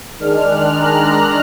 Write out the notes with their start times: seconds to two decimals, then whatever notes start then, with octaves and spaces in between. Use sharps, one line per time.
0.19 D#3 G#3 D4 F6
0.48 F#6
0.77 A#5